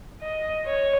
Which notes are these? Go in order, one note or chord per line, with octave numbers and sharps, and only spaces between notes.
D#5
C#5